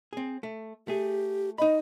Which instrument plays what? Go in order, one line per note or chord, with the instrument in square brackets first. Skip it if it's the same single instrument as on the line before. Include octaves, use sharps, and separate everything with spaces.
[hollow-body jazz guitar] C4 G#4
A3
[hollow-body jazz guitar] A3 G#4 [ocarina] G4
[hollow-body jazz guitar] D#4 B5 [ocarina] D#5